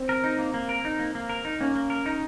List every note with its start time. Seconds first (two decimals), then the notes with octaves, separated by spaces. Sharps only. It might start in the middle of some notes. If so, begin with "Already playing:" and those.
Already playing: C4
0.09 A#4
0.24 D#4
0.38 A#3
0.54 A#3
0.69 A#4
0.85 D#4
0.99 A#3
1.15 A#3
1.29 A#4
1.45 D#4
1.61 A#3 C#4
1.75 A#3
1.90 A#4
2.06 D#4